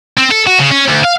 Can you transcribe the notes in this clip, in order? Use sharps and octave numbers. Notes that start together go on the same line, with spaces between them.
C4
A4
F#4
C#3
C#4
D2
F5